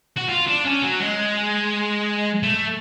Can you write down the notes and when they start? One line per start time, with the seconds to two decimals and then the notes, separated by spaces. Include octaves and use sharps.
0.16 F#4
0.29 F4
0.47 D4
0.65 C#4
0.83 F#3
1.00 G#3
2.43 A3